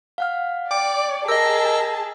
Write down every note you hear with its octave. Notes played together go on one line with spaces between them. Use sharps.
F5 F#5 F6
D5 G5 D6
G#4 A#4 D#5 A5 E6